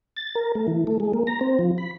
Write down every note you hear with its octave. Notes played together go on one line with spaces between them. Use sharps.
A6
A#4
A3
E3
A3
G#3
A#3
A#5
C4
F3
B5